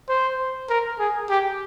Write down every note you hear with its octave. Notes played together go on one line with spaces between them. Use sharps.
C5
A#4
G#4
G4